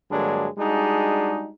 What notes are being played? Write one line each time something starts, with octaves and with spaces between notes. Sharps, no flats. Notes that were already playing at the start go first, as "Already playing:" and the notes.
G2 D3 F#3 G#3 A#3 D4
G3 G#3 D4 D#4 F#4 G#4